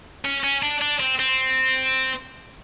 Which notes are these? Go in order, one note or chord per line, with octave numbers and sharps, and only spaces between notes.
C#4
C#4
D4
D4
C4
C4